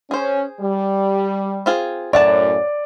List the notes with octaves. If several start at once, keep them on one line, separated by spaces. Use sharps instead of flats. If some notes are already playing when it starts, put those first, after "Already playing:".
C#4 G#4 C5
G3
C4 F4 G#4
F#2 A2 C#5 D5 F#5 A5